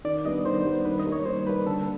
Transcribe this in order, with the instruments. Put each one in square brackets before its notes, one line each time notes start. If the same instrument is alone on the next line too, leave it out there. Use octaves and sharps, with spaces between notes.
[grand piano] D#3 [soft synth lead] D5
[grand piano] G3 B3 D4 [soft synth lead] D#5
[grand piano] D#3 [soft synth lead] C5
[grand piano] G3 B3 D4
[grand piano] D#3 [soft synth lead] B4
[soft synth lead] D#5
[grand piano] G3 A#3
[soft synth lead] C#5
[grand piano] D#3 [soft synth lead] C5
[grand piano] G3 A#3 [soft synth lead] B4
[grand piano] D3 [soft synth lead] A4
[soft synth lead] A4